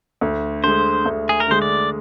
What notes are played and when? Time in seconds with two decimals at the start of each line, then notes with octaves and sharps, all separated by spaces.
0.21 D2
0.64 D3 G#3 C5
1.05 D2
1.29 G#4
1.40 A#4
1.48 D3 G#3 C5
1.62 D5